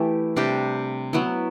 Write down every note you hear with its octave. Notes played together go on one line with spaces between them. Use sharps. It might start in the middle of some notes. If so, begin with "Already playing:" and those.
Already playing: E3 A3 E4 G4
C3 G3 D4 G4
F#3 B3 E4